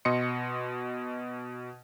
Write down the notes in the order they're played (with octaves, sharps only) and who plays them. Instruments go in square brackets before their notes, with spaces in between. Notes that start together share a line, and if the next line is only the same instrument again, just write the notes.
[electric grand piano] B2 D#5 C6 C#7